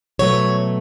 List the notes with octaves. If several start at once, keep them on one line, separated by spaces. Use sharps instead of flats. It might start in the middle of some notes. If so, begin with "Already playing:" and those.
B2 F#3 A3 C#5